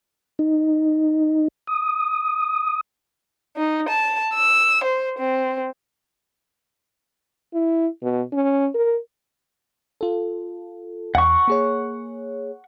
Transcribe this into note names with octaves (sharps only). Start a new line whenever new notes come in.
D#4
D#6
D#4
A5
E6
C5
C4
E4
B2
C#4
A#4
F4 A4
E2 F#5 C#6
A#3 G#4 C#5